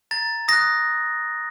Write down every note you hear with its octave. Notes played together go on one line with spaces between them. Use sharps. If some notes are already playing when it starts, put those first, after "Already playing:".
A#5 A6
D#6 F#6 A#6